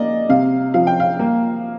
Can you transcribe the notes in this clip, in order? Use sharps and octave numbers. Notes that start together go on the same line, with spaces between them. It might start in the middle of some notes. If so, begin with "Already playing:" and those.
Already playing: A#3 D5 D#5
C3 F5
F3 F5
G5
F5
A#3